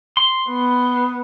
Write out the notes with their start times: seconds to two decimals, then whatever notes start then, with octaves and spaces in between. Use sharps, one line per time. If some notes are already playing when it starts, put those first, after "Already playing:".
0.17 C6
0.49 B3